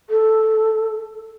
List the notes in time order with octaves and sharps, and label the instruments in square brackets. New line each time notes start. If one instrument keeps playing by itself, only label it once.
[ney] A4